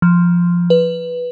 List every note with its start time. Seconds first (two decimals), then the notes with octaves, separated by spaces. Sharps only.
0.02 F3
0.70 B4